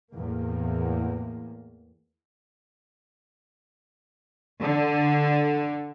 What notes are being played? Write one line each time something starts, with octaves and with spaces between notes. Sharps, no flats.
E2 A2 A#3
D3